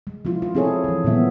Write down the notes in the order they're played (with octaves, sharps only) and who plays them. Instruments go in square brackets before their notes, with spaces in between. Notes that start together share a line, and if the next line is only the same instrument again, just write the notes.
[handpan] G#3
F3 E4 F4
F4
C4 E4 G#4 A4 C#5
E3 F3
A#2 D3 G3 B3 E5